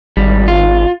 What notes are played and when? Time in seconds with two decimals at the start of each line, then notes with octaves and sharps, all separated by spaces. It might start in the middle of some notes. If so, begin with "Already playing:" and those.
0.17 G#1 G3
0.48 F4